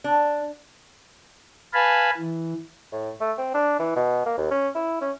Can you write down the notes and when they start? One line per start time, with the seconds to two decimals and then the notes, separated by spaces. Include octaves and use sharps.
0.04 D4
1.74 B4 F5 G#5 A5 B5
2.17 E3
2.92 A2
3.21 A3
3.38 C4
3.54 D4
3.79 E3
3.96 B2
4.26 A#3
4.38 D#2
4.51 C#4
4.75 E4
5.01 C#4